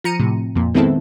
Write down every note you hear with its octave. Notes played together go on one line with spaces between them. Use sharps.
F3 A#5 C#7 D#7
A2 C3
F2 A#2
D#3 G#3 B3 C4 E4 A4